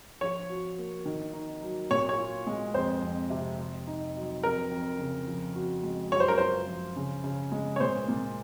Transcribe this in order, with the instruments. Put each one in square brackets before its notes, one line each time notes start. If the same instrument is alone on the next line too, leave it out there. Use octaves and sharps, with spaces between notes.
[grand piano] F3 [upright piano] C#5
[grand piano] F#4
A#3
D#3
D#4
F#3
[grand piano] A#2 [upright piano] C#5
[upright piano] C#5
[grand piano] F4
G#3
[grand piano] F2 [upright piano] C5
[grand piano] F2
C3
C3
D#4
F#3
[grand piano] F2 [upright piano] A#4
[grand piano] F2
C#3
F3
F#4
G#3
[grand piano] F#2 [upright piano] C#5
[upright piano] C5
A#4
[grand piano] F4 [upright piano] C5
[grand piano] F3
C#3
C#3
G#3
[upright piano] C#5
[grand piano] A#2 [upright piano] C5
[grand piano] A#2